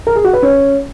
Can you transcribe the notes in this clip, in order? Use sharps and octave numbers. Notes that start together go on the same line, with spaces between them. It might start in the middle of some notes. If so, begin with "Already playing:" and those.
A#4
G#4
F#4
B4
C#4